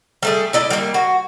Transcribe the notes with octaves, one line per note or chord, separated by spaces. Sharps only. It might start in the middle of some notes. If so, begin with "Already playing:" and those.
G3 A3 G#4
E4 D5 D#5
G3 A#3
F#4